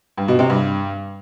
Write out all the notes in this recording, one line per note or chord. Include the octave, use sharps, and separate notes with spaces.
G2
B2
C3
G2